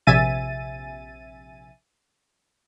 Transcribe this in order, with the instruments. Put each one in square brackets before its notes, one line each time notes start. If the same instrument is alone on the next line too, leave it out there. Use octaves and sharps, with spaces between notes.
[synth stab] A#1 C3 E5 G#5 A6 D#7